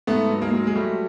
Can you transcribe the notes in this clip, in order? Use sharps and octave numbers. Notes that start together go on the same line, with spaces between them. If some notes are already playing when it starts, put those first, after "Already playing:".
G#2 A3 B3
F#3
G#3 A#3
F#3
G#3
F#3 G3 A3